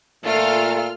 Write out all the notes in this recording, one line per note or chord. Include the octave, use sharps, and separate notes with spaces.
A#2 A3 F4 A4 F6